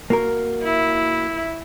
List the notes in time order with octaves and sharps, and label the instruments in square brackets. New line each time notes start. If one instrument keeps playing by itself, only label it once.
[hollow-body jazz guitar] A#3 F#4 A#4
[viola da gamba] E4